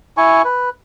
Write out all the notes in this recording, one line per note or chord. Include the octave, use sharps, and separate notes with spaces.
E4 G#5 C#6
B4